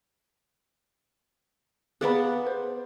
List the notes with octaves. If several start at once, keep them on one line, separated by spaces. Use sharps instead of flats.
B3 G#4 D5 F5 F#5 B5
C5